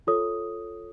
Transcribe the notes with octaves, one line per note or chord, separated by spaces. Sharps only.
F4 A4 C#5 D#6